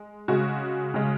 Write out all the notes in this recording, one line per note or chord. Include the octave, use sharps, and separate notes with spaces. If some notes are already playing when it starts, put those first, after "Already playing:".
Already playing: G#3
C#3 G#3 F#4
C#3 G#3